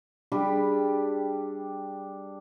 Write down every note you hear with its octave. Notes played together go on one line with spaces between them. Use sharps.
G3 D4 G4 G#4